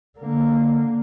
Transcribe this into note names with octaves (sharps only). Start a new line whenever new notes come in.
D3 A#3